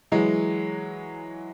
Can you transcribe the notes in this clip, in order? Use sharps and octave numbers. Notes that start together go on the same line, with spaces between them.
E3 F#3 G#3